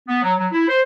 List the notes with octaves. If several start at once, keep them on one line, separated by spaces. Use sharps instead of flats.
B3
F#3
F#3
E4
C5